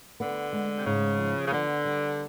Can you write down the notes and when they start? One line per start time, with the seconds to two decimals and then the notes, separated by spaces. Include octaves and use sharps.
0.20 D3 B3
0.53 G#3
0.77 C3
0.86 G#2 C#3
1.18 F3
1.46 C#3
1.52 D3 B3
1.85 G3